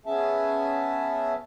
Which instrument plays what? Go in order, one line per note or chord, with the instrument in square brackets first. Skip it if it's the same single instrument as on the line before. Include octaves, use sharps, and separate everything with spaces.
[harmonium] B3 C#4 G#4 E5 A5